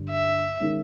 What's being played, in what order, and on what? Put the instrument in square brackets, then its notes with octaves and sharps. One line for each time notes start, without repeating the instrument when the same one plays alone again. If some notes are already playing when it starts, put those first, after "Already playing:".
Already playing: [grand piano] G2 D3 G3
[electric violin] E5
[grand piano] D#3 G#3 C#4